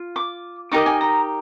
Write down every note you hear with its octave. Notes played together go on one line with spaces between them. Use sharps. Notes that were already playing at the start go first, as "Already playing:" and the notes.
Already playing: F4
D6
D#4 G4 A#4 D#5 D6
G#5
A#5